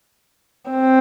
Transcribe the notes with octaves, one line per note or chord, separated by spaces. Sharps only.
C4